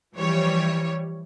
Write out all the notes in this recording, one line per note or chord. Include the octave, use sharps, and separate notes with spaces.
E3 F3 G3 C#5